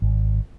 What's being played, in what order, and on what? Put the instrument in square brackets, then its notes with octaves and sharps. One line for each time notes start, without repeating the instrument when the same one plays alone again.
[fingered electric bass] G#1